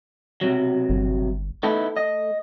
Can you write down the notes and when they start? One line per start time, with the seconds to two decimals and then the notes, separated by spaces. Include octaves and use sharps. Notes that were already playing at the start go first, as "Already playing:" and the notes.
0.41 B1 C3 F#3
0.89 G1
1.63 A3 B3 D#4 E4
1.96 D#5